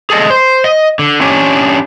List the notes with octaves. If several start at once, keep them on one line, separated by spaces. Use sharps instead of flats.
G#4 A4 D#5
C5
D#5
D3
C#4 D4 G4